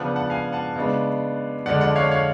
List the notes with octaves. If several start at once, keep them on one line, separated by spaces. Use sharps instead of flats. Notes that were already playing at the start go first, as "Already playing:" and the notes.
Already playing: C#3 F3 B3 D4 F#5 A5
F#5 A5
F5 G#5
F#5 A5
C#3 G#3 B3 D4
F2 D3 G#3 D5 F#5
D5 F#5
C#5 F5
C#5 F5